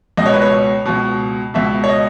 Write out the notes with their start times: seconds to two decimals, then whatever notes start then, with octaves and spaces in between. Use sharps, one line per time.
0.17 C#2 D#5
0.21 B2 C#5
0.34 B4
0.42 C#5
0.85 C#2 B2
1.54 C#2 B2 E5
1.84 C#5
1.89 D#5